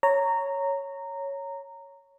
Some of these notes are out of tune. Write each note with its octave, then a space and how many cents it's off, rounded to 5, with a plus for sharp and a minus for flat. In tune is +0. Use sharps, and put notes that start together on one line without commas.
C#5 +0 A#5 -15